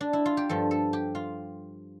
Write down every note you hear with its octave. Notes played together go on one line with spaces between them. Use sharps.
D4
E4
F4
G4
G2 F3 A4
A4
G4
F4